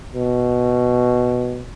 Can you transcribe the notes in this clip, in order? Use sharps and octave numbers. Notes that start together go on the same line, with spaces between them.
B2